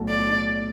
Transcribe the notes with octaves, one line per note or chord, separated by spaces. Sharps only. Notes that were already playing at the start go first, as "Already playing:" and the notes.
Already playing: B1 A2 A3 F#4 A4
D5